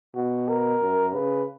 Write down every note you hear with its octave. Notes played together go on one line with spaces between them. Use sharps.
B2 F#4
A#4
F#2
C#3 B4